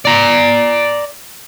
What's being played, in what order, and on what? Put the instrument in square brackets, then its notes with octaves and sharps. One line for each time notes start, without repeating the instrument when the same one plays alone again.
[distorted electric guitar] D5 A#5